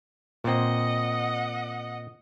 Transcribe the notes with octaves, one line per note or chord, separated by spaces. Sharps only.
A#2 C4 D#5 F#5